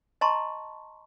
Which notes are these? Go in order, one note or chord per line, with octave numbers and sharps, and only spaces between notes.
D#5 A5 A#5 C6 C#6